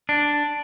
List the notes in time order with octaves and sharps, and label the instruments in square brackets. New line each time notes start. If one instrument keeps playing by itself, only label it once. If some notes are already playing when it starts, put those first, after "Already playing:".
[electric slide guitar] D4